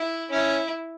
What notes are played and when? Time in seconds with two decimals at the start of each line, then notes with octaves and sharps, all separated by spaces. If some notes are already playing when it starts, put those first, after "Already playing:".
Already playing: E4
0.31 C#4 E4